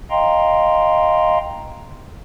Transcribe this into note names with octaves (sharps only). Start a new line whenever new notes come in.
D#5 F5 G5 A#5 C6